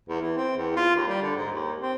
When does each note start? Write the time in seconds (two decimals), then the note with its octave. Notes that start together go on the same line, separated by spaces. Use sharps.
0.09 E2
0.21 E3
0.37 C4
0.56 E2
0.76 F4
0.96 D#2
1.08 G3
1.22 D3
1.36 G#2
1.52 D#2
1.82 C4